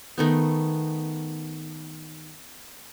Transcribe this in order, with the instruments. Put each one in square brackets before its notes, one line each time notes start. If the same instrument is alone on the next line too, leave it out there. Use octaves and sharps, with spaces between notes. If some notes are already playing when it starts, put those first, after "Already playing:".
[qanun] D#3 A3 B3